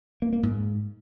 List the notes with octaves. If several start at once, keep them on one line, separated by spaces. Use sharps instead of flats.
A#3
A#3
G#2